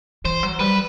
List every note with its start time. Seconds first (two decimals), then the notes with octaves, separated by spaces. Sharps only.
0.25 E3 C5
0.43 F#3
0.59 G3 B4